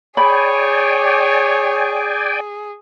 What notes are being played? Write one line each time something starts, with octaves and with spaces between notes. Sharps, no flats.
G#4 C#5 D5 G5 G#5 B5